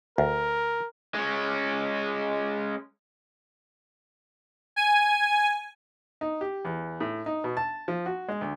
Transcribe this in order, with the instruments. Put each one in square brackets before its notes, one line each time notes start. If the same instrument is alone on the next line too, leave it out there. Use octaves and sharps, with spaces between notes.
[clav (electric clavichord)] D2 [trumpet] A#4
[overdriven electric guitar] G#3 C#4
[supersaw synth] G#5
[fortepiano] D#4
G4
E2
A2
D#4
B2
A5
F3
F#4
G#3
D2